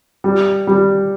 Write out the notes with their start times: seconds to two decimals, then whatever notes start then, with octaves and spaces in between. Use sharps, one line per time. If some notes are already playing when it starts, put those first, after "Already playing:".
0.24 G3
0.67 G3